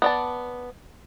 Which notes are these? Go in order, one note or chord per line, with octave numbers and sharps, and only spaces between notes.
B3 D5 A5